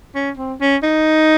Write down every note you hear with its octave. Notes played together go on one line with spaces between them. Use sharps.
C#4
C4
C#4
D#4